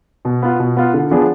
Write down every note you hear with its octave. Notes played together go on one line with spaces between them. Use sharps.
B2
B3 F4
B2
B3 F4
D3
F3 B3 D4 G#4